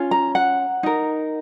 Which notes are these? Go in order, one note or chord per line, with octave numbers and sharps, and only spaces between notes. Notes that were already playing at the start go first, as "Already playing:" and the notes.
Already playing: C#4 F4
A#5
F#5
D#4 A#4